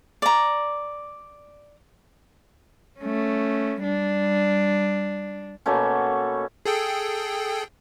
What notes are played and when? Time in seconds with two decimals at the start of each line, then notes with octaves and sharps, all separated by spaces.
0.22 D5 A#5
3.00 A3 C#4
3.83 G3 D4
5.66 B2 A3 A#3 C#4
6.65 G#4 A4 G5